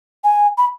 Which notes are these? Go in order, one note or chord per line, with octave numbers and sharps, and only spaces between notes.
G#5
B5